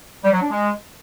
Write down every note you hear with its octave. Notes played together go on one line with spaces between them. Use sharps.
G3
F#3
D4
G#3